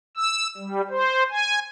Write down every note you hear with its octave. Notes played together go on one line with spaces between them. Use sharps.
E6
G3
C5
G#5